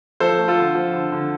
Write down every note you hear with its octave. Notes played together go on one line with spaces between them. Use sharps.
F3 A4 C5
A3
F4 A4
D3
F3
D3
D3